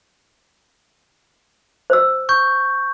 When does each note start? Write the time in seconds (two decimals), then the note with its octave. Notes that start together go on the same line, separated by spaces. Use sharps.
1.90 C5 E6
2.29 C#6 G6